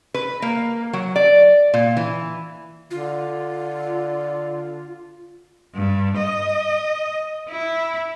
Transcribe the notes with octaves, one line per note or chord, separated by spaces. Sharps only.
B4
A#3
F#3
D5
A#2
E3
D3 F4
G2
D#5
E4